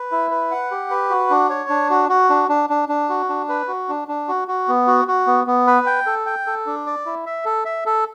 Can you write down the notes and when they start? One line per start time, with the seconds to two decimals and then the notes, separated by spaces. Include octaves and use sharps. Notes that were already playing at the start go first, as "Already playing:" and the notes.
Already playing: B4
0.12 E4
0.31 B4
0.51 F#5
0.71 G4
0.91 B4
1.10 F#4
1.30 D4
1.50 C#5
1.69 D4
1.90 F#4
2.09 F#4
2.30 D4
2.49 D4
2.70 D4
2.89 D4
3.09 F#4
3.29 D4
3.49 B4
3.68 F#4
3.89 D4
4.08 D4
4.28 F#4
4.48 F#4
4.68 B3
4.87 F#4
5.08 F#4
5.27 B3
5.47 B3
5.67 B4
5.86 G5
6.07 A4
6.26 G5
6.47 A4
6.67 D4
6.86 D5
7.06 E4
7.26 E5
7.45 A4
7.65 E5
7.86 A4